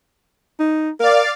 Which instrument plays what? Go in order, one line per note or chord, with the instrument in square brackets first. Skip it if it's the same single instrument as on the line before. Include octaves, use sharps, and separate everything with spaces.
[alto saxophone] D#4
[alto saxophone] A#4 [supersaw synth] D5 F5